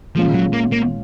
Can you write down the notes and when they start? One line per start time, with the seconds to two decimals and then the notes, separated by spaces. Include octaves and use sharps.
0.15 A#2 F3 G#3 C#4 F4
0.34 F#3
0.53 A#3
0.72 A#3